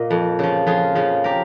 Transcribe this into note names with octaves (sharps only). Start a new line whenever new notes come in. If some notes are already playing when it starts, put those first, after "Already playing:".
Already playing: A#2 D#5
F2
C#3 F3
F2 F4 G#4
C#3 F3
G4 A#4